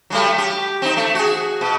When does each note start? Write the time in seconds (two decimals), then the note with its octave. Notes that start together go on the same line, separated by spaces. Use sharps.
0.10 F#3 G3 A3
0.38 G4
0.82 C4 D#4
0.97 A3
1.15 F#4 G#4
1.61 B2